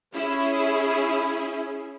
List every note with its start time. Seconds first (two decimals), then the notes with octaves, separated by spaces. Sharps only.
0.14 C#4 E4 G#4